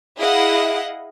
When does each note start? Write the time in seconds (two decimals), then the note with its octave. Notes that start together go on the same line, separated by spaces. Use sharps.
0.18 E4 G#4 D#5 F5 F#5